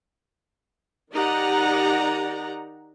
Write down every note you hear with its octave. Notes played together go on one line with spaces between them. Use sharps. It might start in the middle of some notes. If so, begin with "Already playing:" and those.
D#3 D#4 G4 D5 F#5 A#5